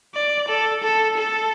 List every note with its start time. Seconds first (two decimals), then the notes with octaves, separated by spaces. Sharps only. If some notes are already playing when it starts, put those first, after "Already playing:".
0.15 D5
0.48 A4
0.83 A4
1.17 A4